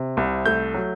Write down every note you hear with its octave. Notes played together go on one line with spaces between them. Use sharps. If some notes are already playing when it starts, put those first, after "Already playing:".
Already playing: C3
C2
A3 G6
F#3